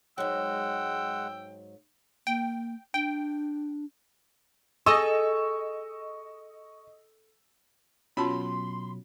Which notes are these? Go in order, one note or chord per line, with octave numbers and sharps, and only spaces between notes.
G#2 F#3 G#3 F#5 G5 E6
A#3 G5
D4 G5
G#4 A4 D#5 C#6 E6 E7
B2 F#3 C#4 F4 A5 B5 C6